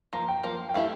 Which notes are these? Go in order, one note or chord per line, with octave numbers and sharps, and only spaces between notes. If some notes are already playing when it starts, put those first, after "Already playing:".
F3 A#3 A#5
G5
F3 A#3
G5
E3 A3 E4 G4 F5